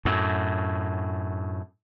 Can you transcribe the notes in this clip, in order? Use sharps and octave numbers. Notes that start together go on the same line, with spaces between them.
F#2 A2